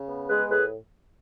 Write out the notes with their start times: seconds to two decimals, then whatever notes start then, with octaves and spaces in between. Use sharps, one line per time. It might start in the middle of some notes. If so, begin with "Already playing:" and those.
Already playing: C#3
0.08 B3
0.29 G#3 G#4 B4
0.49 A2 G#4 B4